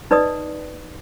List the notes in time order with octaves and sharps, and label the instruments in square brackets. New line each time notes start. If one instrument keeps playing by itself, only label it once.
[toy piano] D#4 B4 D5 D#5 D#6